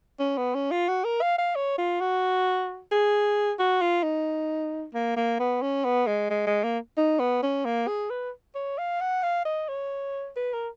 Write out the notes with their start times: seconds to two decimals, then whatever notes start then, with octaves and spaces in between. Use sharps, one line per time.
0.19 C#4
0.37 B3
0.54 C#4
0.71 F4
0.88 F#4
1.05 A#4
1.22 F5
1.38 F5
1.56 C#5
1.78 F4
2.00 F#4
2.91 G#4
3.59 F#4
3.81 F4
4.03 D#4
4.94 A#3
5.16 A#3
5.39 B3
5.62 C#4
5.84 B3
6.07 G#3
6.30 G#3
6.47 G#3
6.64 A#3
6.97 D#4
7.19 B3
7.42 C#4
7.65 A#3
7.87 G#4
8.10 B4
8.55 C#5
8.78 F5
9.00 F#5
9.23 F5
9.45 D#5
9.69 C#5
10.36 B4
10.53 A#4